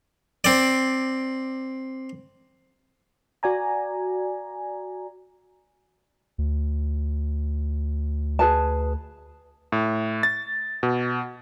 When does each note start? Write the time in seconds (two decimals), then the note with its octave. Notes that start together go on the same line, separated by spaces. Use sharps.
0.44 C4 D5
3.43 F#4 D5 G#5 A#5
6.38 D2
8.39 G#4 B4 A5
9.72 A2
10.23 A6
10.83 B2